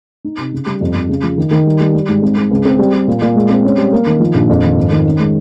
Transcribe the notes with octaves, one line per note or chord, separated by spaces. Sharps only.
D#4
C3
C#3
G3
F2
F2
C#3
F3
D#3
D#3
G3
G3
G3
G#2
C4
C4
C#2
C4
G3
G3
A#2
A#2
G#3
C4
C#4
G3
A#3
D#3
F3
A#1
F2
D#3
G#1
D#3
C#4
G#3